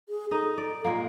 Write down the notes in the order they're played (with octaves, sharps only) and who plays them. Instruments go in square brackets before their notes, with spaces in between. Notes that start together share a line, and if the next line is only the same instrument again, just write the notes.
[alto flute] G#4
[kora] D#4 D#5 [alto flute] A4
[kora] D5
A#2 G#3 A#3